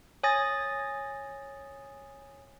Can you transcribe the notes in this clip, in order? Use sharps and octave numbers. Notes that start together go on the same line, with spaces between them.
C#5 G#5 D#6 A6 A#6